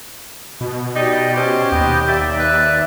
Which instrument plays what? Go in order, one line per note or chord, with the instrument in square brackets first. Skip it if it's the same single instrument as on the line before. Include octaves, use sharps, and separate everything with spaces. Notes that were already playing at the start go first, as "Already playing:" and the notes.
[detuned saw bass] B2
[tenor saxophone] D#4 [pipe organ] G4 D5 D#5
[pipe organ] C#4 C5 [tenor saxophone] G4
[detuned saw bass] D#2 [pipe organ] B3 D#5 G5
[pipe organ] D5 E5
[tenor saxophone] B4